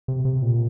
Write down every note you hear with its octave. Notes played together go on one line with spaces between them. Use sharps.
C3
C3
A#2